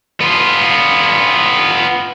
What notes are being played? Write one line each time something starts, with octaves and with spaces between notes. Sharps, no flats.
B3 F4